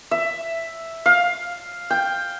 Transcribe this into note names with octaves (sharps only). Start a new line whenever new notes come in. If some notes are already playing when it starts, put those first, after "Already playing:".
E5
F5
G5